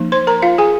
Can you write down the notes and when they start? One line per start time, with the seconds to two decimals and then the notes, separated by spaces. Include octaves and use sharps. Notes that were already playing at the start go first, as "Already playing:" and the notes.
Already playing: F3 A#3 D#4
0.12 C5 C6
0.27 A#4 A#5
0.42 F4 F5
0.58 G#4 G#5